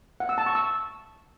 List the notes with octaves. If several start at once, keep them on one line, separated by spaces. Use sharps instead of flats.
F#5
E6
A5
C#6
E6